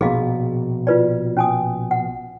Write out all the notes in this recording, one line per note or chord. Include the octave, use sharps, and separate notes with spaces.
A#1 B2 G#4 D#5 F5
F4 B4 D5
C#4 G#5 D#6
F#5